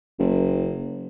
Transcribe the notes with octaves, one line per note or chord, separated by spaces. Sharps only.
F#1